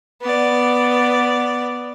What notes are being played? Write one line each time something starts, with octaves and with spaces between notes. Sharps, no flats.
B3 D5